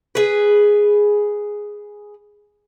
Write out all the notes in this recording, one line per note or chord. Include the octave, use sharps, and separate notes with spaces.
G#4 B4